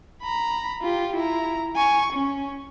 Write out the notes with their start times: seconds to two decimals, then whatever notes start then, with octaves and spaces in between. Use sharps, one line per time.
0.22 A#5 B5
0.81 F4 G4
1.16 E4 A#5
1.76 G#5 C#6
2.12 C#4